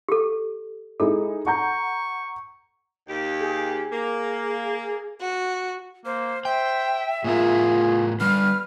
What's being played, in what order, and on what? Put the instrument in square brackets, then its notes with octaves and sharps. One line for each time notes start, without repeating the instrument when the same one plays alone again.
[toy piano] G4 A4
[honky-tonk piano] G#3 D#4 E4 [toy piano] A4
[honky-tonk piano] F#5 A#5 G6 [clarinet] C#6
[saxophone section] D#2 G4
[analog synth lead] G#4
[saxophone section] A#3
[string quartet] F#4
[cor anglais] A#3 [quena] C5
[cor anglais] C5 [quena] E5 [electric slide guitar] G5
[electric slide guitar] A2 B3 A#4 [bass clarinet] F4 [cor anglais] G#4
[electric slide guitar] D3 G3 [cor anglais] B4 [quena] F6